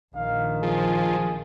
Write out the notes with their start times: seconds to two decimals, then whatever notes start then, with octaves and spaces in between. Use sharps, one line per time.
0.15 A#1 D#3 F5
0.63 F3 G#4